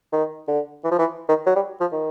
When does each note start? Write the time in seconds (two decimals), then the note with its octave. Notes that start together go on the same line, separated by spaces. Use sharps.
0.13 D#3
0.48 D3
0.84 E3
0.91 F3
0.99 E3
1.29 D#3
1.46 F#3
1.56 G3
1.81 F3
1.92 D#3